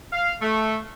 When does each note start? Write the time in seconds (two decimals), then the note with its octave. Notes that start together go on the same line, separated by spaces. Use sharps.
0.13 F5
0.42 A3